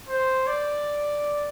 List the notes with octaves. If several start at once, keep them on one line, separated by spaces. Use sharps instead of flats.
C5
D5